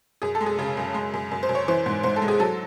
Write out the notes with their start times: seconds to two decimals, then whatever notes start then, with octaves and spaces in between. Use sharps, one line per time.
0.22 F#2 G#4
0.35 A4
0.41 G#3
0.46 G#4
0.59 C#3 G#4
0.77 F#2
0.94 G#3
1.14 F#2
1.31 F#2
1.43 C5
1.49 F#2
1.55 C#5
1.68 E3 C5
1.86 G#2
2.03 G#2 C5
2.16 A4
2.22 G#3
2.28 G#4
2.40 F#3 A4